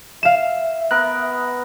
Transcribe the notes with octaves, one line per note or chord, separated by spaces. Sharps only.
E5 F5 E7
B3 A#4 F#6